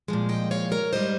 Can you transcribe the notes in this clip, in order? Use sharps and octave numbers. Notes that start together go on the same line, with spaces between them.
A#2 F3 G#3
D#5 G5
C#5 F5
A#4 C#5
G#2 G3 C5 D#5